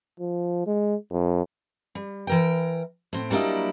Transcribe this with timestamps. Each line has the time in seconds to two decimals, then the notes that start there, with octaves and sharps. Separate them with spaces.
0.20 F3
0.66 G#3
1.11 F2
1.95 G3
2.27 E3 A#4 G5
3.13 A2 C4
3.30 F#3 G3 A#3 D4 E4 D#5